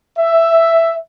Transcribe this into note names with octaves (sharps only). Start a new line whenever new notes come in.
E5